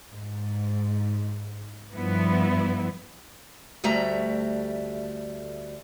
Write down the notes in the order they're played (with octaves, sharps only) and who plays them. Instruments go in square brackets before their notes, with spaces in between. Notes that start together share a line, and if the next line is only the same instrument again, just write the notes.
[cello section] G#2
G2 F3 B3 E4
[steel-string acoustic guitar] D2 G3 A3 F#4 E5 A#5